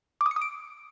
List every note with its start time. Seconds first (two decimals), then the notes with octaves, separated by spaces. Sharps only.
0.21 D6
0.26 D#6
0.31 C#7
0.36 D#6
0.41 D7